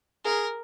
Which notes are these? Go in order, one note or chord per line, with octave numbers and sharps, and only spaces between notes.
G#4 A#4